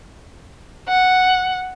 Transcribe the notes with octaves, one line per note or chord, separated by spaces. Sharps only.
F#5